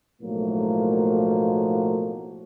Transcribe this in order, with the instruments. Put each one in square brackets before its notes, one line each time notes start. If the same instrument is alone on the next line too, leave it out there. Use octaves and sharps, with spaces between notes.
[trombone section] B1 A2 F3 F#3 A#3